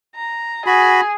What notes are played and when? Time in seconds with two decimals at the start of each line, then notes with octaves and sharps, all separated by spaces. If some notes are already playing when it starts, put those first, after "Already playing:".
0.15 A#5
0.67 F#4 G#4 B5